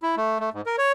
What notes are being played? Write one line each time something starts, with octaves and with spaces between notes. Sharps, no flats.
E4
A3
A3
G#2
A#4
C#5